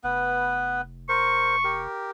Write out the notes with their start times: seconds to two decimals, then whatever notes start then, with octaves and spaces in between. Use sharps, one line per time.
0.04 F1 B3 B4
1.09 A#4 C5 C#6
1.64 G4 A#4